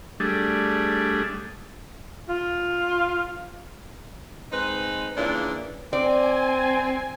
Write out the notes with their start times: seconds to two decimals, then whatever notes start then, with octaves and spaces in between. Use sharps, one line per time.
0.20 G3 A3 D4 G#4
2.29 F4
4.52 G#3 C4 D#4 B4
5.16 A#2 C#3 E3 D4
5.93 C4 D5 G#5